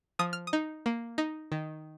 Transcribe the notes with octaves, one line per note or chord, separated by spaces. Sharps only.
F3 D#6
F6
D#6
D#4
A#3
D#4
D#3